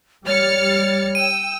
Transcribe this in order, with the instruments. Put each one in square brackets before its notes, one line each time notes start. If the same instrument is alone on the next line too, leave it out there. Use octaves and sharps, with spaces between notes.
[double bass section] G3 [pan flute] C#5 [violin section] F6 A6 C#7
[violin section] G5 E6 [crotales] D#7